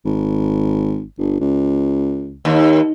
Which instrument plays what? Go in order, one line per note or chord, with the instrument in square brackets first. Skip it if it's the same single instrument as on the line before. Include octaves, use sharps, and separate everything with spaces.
[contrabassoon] G#1
G1
C#2
[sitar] D#2